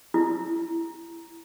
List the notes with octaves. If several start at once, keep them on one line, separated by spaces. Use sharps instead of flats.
E4